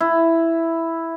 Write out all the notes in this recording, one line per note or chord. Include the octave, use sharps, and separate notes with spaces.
E4